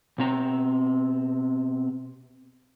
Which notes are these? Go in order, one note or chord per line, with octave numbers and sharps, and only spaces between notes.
B2 C4 A#5